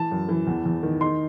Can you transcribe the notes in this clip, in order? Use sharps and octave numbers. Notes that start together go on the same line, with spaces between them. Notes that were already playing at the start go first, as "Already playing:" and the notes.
Already playing: E3 A5
F#2
E3
E2
E2
D#3
D#4 C6